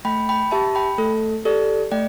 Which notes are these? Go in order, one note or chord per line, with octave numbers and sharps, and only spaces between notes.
A3 G5 B5
G5 B5
G4 E5 A5
G5 B5
A3 A4
G4 A4 D5
A3 D5 G5